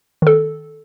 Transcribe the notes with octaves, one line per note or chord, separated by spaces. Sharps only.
D#3 A4